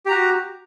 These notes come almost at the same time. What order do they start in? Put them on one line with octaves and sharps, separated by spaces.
G4 A#5 F#4